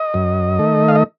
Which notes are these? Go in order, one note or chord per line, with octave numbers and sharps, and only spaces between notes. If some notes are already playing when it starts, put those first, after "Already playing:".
Already playing: D#5
F#2
D#3 A3
F5
D#5